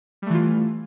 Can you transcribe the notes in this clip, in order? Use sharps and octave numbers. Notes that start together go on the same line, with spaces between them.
E3 G3 A3 F4